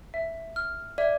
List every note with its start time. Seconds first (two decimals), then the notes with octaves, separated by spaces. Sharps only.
0.14 E5
0.56 F6
0.98 D5 E5